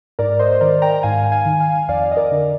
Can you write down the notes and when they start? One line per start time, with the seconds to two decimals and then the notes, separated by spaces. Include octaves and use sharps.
0.19 G#2 A#4 D5
0.39 C5 D#5
0.52 C5
0.61 D#3 A#4 D5
0.82 G5 A#5
1.03 G#2 F5 G#5
1.32 F5 G#5
1.46 D#3
1.60 F5 G#5
1.89 F2 D5 F5
2.12 D#5
2.17 A#4 D5
2.32 D3